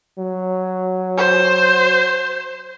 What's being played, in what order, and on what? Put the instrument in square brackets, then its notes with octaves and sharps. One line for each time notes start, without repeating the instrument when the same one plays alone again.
[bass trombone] F#3
[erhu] C5